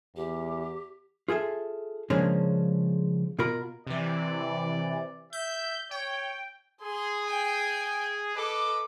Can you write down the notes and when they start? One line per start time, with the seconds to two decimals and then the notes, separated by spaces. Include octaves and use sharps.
0.16 E2 G4
1.28 F4 G#4 A4 E5
2.10 C#3 F3 G#3 A#3 C#4 D4
3.39 B2 F4 A#4 B5
3.87 C3 E3 D5
5.33 E5 G6
5.91 C#5 G5
6.81 G#4 C6
7.26 G5 G#5
8.35 A4 B4 D#5 D6